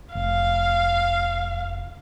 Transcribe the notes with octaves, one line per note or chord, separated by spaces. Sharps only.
F1 F5